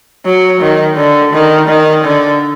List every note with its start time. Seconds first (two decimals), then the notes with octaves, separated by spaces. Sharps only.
0.25 F#3
0.61 D#3
0.97 D3
1.33 D#3
1.68 D#3
2.04 D3